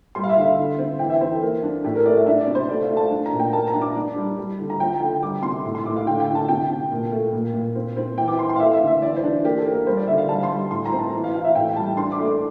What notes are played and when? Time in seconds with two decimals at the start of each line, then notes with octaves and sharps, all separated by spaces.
0.15 G3 C6
0.24 F5
0.29 E5
0.37 D3
0.44 E5
0.58 D3
0.78 C4
0.99 E3 G5
1.10 E5
1.21 C4 C5
1.31 A4
1.42 A#3
1.63 D4
1.84 A2 G4
1.95 A#4
2.06 A3 D5
2.16 E5
2.26 D4 E5
2.41 D5
2.47 C3
2.55 C5
2.69 A3 D5
2.82 F5
2.90 A3
2.97 A5
3.11 D4
3.26 A#5
3.33 A#2
3.39 G5
3.53 A#3 A5
3.68 A#5
3.74 D4
3.81 D6
3.95 D4
4.16 G3
4.38 G3
4.59 D3
4.70 A#5
4.79 F3 G5
5.00 D3 G5
5.21 G3 D6
5.43 C3 C6
5.65 A2
5.75 C6
5.86 A2 D6
5.96 F5
6.06 D3 G5
6.20 G5
6.28 D3
6.35 A5
6.49 C3 G5
6.69 C3
6.91 A#2
7.11 A3
7.33 A#2
7.54 A#2
7.75 C4
7.97 C4
8.17 E3 G5
8.28 D6
8.39 E3 C6
8.49 C6
8.56 F5
8.60 A3 E5
8.74 E5
8.81 D3
8.87 E5
9.02 E3 D5
9.16 C5
9.24 D4
9.44 A#3 G4
9.58 A4
9.65 A#3
9.73 A#4
9.87 G3 C5
9.97 D5
10.07 D3 E5
10.18 F5
10.29 G3 A5
10.43 C6
10.50 G3
10.71 A2 C6
10.85 A#5
10.92 C4
10.99 A5
11.14 E3
11.24 F5
11.34 E3 F5
11.44 E5
11.55 A2 G5
11.76 G3 A5
11.97 D4 C6
12.12 D6
12.19 A3
12.25 D6